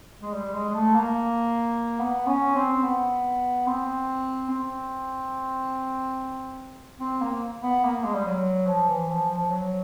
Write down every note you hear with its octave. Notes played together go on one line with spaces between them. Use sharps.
G#3
G3
G#3
G#3
A3
A#3
B3
C#4
C4
B3
C4
C4
C4
A#3
B3
A#3
G#3
G3
F#3
F3
E3
F3
F3
F#3